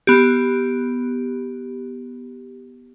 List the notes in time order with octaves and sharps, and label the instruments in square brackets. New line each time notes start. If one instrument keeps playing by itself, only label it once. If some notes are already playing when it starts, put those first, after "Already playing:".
[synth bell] B3 G4